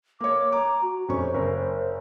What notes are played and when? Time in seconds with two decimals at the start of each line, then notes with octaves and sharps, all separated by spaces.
0.21 A#3 C#5 D6
0.52 A#5 D6
0.82 F#4
1.09 F1 C#4 C5 C#6
1.34 F#1 A#4